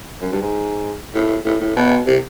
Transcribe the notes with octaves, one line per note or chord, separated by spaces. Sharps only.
F#2
G2
G#2
A2
A2
A2
B2
C3